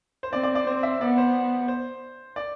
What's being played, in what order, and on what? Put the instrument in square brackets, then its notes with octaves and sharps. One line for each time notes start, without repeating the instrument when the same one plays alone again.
[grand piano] C5
[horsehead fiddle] C4 [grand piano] D5
[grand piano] D5
D5
[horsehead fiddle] C4 [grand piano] C5
[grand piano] E5
[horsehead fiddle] B3 [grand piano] D5
[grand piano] C5
C5
D5